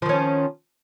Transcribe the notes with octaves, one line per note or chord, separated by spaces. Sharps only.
D#3 F3 C#4